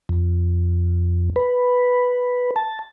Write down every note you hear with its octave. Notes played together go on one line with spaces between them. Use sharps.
F2
B4
A5